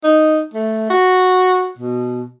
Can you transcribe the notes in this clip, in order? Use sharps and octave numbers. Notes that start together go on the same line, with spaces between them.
D#4
A3
F#4
B2